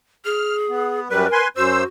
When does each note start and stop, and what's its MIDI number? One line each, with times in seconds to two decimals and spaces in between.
0.25 1.00 68
0.25 0.57 89
0.70 1.08 59
1.10 1.27 42
1.10 1.27 55
1.10 1.40 70
1.10 1.27 71
1.32 1.48 71
1.32 1.48 80
1.32 1.48 84
1.57 1.84 42
1.57 1.86 66
1.57 1.84 72
1.57 1.84 88